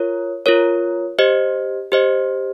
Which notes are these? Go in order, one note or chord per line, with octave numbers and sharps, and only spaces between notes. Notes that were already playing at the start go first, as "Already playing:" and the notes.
Already playing: F4 A#4 C#5
F4 A#4 C#5
G4 C5 D#5
G4 C5 D#5